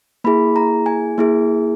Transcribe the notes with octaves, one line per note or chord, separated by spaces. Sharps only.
A#3 E4 G#4 B5
A#5
G#5
A#3 E4 G#4